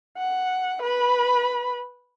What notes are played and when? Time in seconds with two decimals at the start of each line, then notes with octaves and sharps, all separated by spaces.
0.17 F#5
0.82 B4 B5